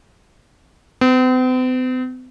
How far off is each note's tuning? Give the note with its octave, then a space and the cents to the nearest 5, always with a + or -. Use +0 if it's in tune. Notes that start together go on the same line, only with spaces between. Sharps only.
C4 -45